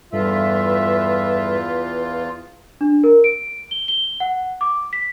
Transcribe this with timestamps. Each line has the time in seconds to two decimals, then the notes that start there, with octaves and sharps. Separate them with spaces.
0.13 E2 G2 G3 F4 A4 B4 E5
2.81 D4
3.04 A#4
3.24 D7
3.71 G7
3.88 G7
4.20 F#5
4.61 D6
4.93 B6